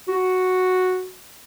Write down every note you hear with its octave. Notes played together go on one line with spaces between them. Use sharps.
F#4